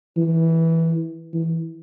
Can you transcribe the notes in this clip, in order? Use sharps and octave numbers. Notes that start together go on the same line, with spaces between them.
E3
E3